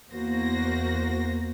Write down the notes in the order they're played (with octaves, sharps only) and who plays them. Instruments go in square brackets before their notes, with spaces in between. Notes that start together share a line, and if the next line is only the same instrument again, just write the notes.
[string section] E2 A#3 F#4 C5 A#6